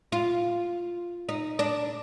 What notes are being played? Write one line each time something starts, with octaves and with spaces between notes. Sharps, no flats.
F4
D#4
D4